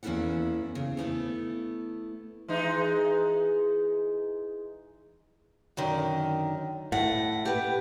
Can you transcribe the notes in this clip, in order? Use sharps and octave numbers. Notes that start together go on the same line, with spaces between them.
E2 A#3 C#4 E4 A4 F#5
C#3
A3 B3 E4 A4
E3 G#3 D#4
F#2 D3 D#3
A2 F#5
G4 B4